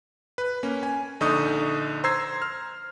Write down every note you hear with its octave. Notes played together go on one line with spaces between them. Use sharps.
B4
A#3 C#4
G#5
A#1 D3 D#4 C#6 D#6 G6
C5 A#5 C6 E6 G#6 C7
F6